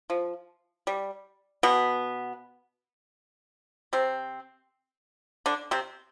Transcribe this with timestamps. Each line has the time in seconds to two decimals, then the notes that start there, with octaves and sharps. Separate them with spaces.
0.10 F3
0.87 G3
1.63 B2 B3
3.93 C3 C4
5.46 D3 D4
5.71 C3 C4